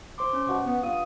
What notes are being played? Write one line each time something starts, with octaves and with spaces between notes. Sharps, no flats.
C5 C6 D6
C#4
G2 B2 F#5 C#6
B3
G2 F4 D#6